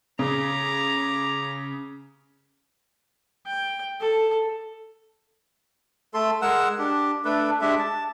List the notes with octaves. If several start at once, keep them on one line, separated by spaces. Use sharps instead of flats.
C#3 A#5 D6
G5
A4
A3 A4 C6
G#3 A#4 F#5 E6
D4 G4
A3 D4 A4 B4
G#3 D4 G4 E5
A5